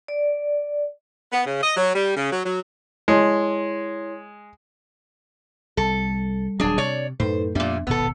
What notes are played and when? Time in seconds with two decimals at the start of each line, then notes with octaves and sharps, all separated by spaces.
0.08 D5
1.33 B3
1.46 C#3
1.62 D#5
1.77 F#3
1.95 G3
2.16 C#3
2.32 F#3
2.46 F#3
3.08 G#3 E4 C#5 C6
5.77 C2 G3 A4
6.60 D#1 F#3 D4 G#4
6.78 C3 C#5 D5
7.20 F#2 A2 D#4 A4 B4 C5
7.55 F2 A#2 G3 B3 D4 E5
7.87 D#1 G#1 B2 B3 A4 E6